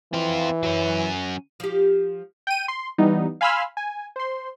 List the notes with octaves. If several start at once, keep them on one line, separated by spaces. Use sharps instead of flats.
E3 C4 F4
F#3 C#4
F3 G4
G5 D#7
C6
E3 G3 B3 D#4
F5 G#5 B5 C6 E6 F6
G#5
C5 C6